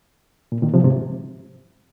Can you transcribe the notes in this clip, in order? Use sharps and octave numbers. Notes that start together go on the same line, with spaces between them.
A#2
A#2 D#3
C3 F3
G#2 C3